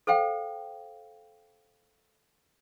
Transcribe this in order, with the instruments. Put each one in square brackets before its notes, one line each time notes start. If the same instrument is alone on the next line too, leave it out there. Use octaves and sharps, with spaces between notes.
[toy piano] A4 C5 F5 G5